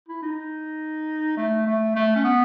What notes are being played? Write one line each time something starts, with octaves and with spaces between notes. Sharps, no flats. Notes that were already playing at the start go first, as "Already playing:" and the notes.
E4
D#4
A3
A3
A3
C#4
B3